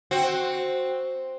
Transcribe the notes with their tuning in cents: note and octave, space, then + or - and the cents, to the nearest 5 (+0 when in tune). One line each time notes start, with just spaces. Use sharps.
C4 +5 F#4 +0